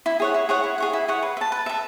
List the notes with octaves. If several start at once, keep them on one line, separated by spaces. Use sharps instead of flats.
E4
G#4 C#5 F#5
E4
G#4 C#5 F#5
E4
G#4 C#5 F#5
E4
G#4 C#5 F#5
B4
E5
A5
B4
E5 A5